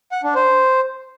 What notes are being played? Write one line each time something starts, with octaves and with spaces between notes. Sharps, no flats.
F#5
D4
C5